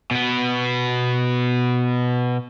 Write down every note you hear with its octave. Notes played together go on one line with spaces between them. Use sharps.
B2 B3